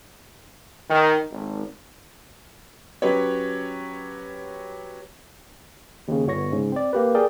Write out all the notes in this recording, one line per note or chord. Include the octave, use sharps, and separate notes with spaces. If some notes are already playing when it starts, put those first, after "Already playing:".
D#3
G#1
F#3 C#4 G4 B4 C#5
D#2 C#3
G1 B3 C#5 C#6 A#6
G#2 C#3
C4 D5
A#3 G4 B4
G#4 A#4 D5 G5